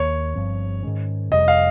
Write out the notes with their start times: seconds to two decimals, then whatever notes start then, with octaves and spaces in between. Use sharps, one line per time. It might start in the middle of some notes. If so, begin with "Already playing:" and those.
Already playing: D#2 D#3 A#3 C#5
0.36 G1 G2 F3 C4
0.83 G#2 D#3 G#3 C#4
1.31 F1 F2 C3 G3 D#5
1.48 F5